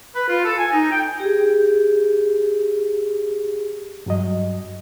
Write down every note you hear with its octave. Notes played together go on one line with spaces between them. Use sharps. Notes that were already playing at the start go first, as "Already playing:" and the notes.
B4
F4
A4
G#5
D#4
G5
G4 G#4
G2 F#3 D#5